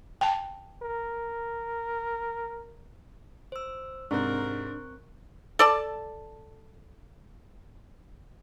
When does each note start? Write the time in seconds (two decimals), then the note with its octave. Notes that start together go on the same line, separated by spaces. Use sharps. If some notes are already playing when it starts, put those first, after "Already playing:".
0.21 G5 A5
0.82 A#4
3.52 C5 E6
4.11 G#2 C3 C4 D4 A#4 C#6 F#6
5.59 A4 D5 A5